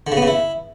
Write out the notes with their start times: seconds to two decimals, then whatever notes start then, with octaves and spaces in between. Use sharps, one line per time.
0.07 D3
0.12 C#3
0.17 B3
0.22 C#3
0.28 E4